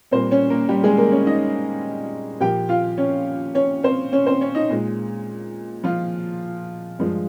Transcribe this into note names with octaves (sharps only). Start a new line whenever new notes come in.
A#2 G3 A#3 C4 C5
C#4 C#5
A#3 A#4
G3 G4
G#3 G#4
A#3 A#4
C#4 C#5
D#4 D#5
A#2 F3 A#3 G4 G5
F4 F5
C#4 C#5
C#4 C#5
C4 C5
C#4 C#5
C4 C5
C#4 C#5
D#4 D#5
A#2 G#3
F3 F4
G2 F3 G#3